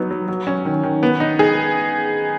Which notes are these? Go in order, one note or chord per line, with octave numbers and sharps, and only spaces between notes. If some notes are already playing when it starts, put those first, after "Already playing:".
Already playing: F#3 B3 D#4
F#3
F#3
C#4
D#3
D#3
B3
D#4
G#4